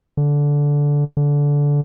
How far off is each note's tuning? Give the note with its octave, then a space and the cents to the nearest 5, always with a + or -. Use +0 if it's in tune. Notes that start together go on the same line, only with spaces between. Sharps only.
D3 -15
D3 -20